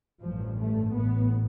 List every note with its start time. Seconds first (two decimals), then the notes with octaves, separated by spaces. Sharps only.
0.21 A1 G2 F3
0.58 A3
0.94 A1 A2 B3